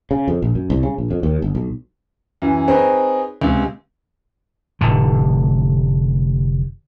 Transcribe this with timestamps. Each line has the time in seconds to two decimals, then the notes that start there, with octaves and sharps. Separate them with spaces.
0.11 C#3
0.28 F2
0.42 A#1
0.55 F#2
0.70 C2
0.83 C#3
0.98 A#1
1.11 F2
1.23 D#2
1.42 G1
1.55 B1
2.42 F#2 E3
2.68 C4 D#4 G#4 B4 C#5
3.41 C#2 C3
4.81 F1 A2 D3